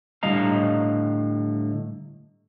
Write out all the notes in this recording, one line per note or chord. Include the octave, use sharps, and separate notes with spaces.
A2 D3 G3 D#5 F5 A#5